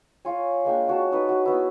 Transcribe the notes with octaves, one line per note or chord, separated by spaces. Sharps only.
F4 C#5 G#5
G#3 A#3 D4 G5
C#4 F#4 A5
D#4 F#4 A4 B4
F#4
B3 E4